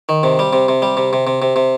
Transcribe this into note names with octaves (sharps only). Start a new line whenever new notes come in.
D#3
C3
G3
C3
C3
G3
C3
C3
C3
C3
C3